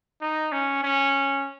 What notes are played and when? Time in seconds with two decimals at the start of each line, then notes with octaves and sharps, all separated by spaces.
0.22 D#4
0.52 C#4
0.83 C#4